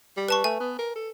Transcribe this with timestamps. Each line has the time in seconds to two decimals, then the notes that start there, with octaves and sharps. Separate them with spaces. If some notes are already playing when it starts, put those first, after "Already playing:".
0.17 G3
0.28 B4 A5 C#6
0.44 A3 G#5
0.60 B3
0.79 A#4
0.95 A4